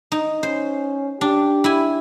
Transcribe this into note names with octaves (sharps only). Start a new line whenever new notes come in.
D#4
C#4 C5
D4 G4
E4 G#5